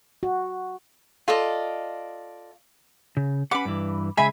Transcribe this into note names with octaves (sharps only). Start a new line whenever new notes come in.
F#4
F4 A4 D5 D#5
C#3
C#4 B4 F#5 B5 D6
G2 E3
C#3 G#3 G#4 E5 G#5 B5